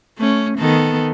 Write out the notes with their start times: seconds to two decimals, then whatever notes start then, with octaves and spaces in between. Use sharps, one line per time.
0.18 A3 C#4
0.58 D#3 B3 A4